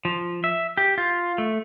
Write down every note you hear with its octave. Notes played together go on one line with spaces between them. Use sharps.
F3
E5
G4
F4
A3